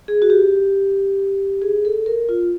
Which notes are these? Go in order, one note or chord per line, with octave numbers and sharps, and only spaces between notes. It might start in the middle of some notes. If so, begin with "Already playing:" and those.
G#4
F#4
G4
G#4
A4
A#4
F4